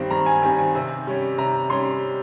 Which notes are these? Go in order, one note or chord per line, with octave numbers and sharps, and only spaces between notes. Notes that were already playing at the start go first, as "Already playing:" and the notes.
Already playing: G2 D#3 G3 C4
G2 A#5
G#5
D#3 G3 C4 G#5
G#5
C3
G3 C#4
C3 A#5
G3 C#4 C6